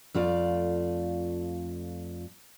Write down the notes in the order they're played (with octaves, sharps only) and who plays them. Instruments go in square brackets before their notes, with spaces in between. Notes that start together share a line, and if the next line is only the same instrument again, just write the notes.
[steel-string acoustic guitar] F2 A3 F4 D5